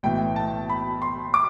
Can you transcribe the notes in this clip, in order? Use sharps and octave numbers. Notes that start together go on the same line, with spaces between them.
B1 A2 E3 G5
A5
B5
C6
D6